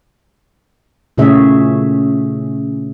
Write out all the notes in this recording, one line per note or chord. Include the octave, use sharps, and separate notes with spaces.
A#2 C#3 A3 C#4 G#4 E5